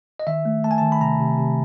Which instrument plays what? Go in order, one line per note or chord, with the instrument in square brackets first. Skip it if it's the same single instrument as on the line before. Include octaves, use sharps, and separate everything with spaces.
[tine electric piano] D#5
D#3 E5
A3
A3 A5
G#5
D#3 A5
B5
C3 A#5
C3
C3